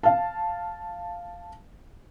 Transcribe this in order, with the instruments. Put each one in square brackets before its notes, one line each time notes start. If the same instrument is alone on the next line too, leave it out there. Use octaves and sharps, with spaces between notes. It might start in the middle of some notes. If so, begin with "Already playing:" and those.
[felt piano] F5 A5